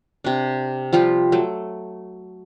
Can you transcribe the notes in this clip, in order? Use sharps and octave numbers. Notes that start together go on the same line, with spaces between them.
C3 D4
F3 G3 F4 G4
F#3 A3